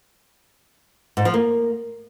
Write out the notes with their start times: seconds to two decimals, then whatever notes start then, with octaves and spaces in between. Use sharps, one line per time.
1.17 G#2
1.25 F3
1.34 A#3